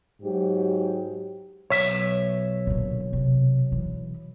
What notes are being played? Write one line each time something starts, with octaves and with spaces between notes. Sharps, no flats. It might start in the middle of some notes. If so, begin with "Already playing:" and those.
G#2 F#3 G4
B1 C#5 E5
A#2 D3
C3
E3